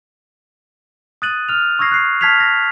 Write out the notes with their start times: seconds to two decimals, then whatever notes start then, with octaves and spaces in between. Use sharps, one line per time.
1.22 D#6 F#6 A6 D#7 F#7
1.49 F6 F7
1.79 C#6 D#6 E6 G#6 A#6 C7
1.92 F#6 C7
2.21 A5 F6 G#6 B6 C7 F7
2.40 A#6